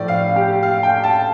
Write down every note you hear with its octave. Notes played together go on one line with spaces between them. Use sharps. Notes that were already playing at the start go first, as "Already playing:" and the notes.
Already playing: A2 F3 A3 D5
F5
G4
F5
G5
A5